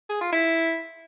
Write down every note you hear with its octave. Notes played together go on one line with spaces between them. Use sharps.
G#4
F4
E4